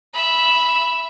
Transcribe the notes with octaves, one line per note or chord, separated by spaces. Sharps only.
E5 B5